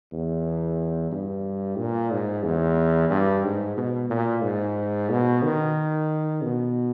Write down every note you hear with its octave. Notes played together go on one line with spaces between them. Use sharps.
E2
G2
A#2
G#2
E2
G2
G#2
B2
A#2
G#2
B2
D#3
B2